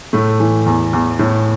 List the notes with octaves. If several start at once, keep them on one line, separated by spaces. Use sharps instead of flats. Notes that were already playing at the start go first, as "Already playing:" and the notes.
A2 A3
E3
E2
E2
A2